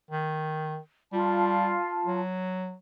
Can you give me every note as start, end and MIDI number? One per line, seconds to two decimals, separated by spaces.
0.11 0.78 51
1.13 1.77 55
1.13 2.19 65
1.13 2.19 81
2.06 2.74 54